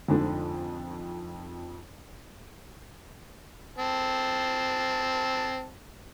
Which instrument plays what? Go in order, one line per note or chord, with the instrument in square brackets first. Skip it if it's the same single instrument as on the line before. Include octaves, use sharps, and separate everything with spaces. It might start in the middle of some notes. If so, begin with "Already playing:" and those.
[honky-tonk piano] F2 [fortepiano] G#2 D3 F3
[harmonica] C4 A5